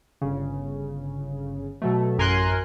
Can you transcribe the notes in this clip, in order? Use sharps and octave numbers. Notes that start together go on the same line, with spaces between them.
G1 C#3
B2 F#3 A3
A1 F#2 A#4 G#5 C6 F#6